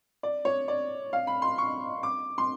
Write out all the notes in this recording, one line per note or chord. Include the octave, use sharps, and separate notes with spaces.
D5
C#5
D5
F5
B5
C6
C#6
D6
C6